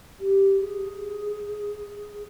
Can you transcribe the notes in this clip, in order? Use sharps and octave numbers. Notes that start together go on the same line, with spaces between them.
G4
G#4